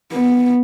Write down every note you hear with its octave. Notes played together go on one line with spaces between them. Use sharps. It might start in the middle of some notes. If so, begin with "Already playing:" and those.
B3